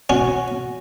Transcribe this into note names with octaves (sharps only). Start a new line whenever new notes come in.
C#4 F#4